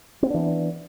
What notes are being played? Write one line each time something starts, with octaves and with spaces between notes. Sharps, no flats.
E3 B3 C4 D4